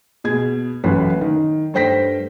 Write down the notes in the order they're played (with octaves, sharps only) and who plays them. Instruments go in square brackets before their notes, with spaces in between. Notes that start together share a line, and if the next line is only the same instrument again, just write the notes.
[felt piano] B2 G#4 G#6
A1 F#2 A2 B4
D#3
G2 A3 C5 G5 A#6 B6